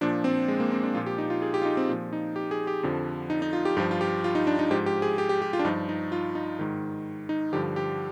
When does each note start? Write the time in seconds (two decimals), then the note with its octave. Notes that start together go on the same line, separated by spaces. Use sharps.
0.01 A#2 F3 D4
0.24 C4
0.48 G#3
0.60 A#3
0.72 C4
0.83 D4
0.94 A#2 F3 F4
1.06 G4
1.18 D#4
1.30 F4
1.42 G#4
1.54 G4
1.62 F4
1.65 D#4
1.77 C4
1.89 A#2 F3
2.13 D#4
2.36 G4
2.51 G#4
2.67 G4
2.83 F2 D3 F3
3.30 D#4
3.42 D#4
3.53 F4
3.65 G4
3.77 G2 G4
3.80 F3
3.91 F4
4.01 G4
4.24 F4
4.35 D#4
4.47 D4
4.59 D#4
4.71 G#2 F3 G4
4.86 G4
5.02 G#4
5.18 G4
5.29 G4
5.42 G4
5.53 F4
5.59 D4
5.65 G2 F3 D#4
5.89 D#4
6.12 F4
6.35 D#4
6.59 G#2 D#3
7.29 D#4
7.53 G2 D3 F3 G4
7.76 G4